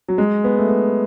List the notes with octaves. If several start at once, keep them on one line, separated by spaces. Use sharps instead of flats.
F#3
G#3
B3
A3
B3